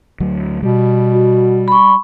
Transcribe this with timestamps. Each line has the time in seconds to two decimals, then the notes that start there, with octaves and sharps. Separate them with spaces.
0.20 D2 F#3
0.63 B2 G3
1.15 F#4
1.68 B5 C#6